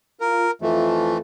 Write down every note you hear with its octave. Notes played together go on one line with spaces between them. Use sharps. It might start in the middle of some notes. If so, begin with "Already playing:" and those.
F4 A#4
F2 E3 A3 F4 A4